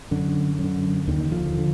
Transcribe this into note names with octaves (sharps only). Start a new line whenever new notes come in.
F#2 D3
F#2 D3
D#2 D3 D#3
D3 F3
D3